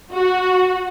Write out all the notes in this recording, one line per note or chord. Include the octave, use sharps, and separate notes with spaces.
F#4